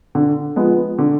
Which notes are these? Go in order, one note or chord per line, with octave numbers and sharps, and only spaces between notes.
D3
F3 G#3 B3
D3